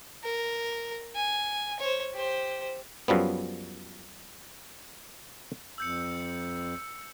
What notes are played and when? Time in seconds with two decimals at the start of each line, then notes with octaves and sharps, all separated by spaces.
0.23 A#4
1.15 G#5
1.79 C5 C#5
2.14 G4 C5
3.08 F#2 F3 G3 B3
5.78 F2 E6 G6 C#7